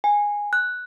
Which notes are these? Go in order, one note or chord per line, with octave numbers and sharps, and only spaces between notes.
G#5
F#6